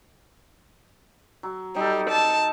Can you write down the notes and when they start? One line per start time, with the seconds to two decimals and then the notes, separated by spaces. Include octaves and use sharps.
1.43 F#3
1.76 G3 D#4 A4
2.10 A5